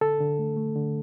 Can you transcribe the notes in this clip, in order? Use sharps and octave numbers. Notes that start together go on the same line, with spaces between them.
D3 A4
D3
A3
A3
D3